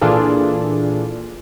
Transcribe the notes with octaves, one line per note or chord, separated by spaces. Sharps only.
A#2 E3 D4 F4 G#4 A4